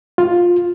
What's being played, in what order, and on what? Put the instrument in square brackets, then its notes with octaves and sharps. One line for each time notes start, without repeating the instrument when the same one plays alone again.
[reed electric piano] F4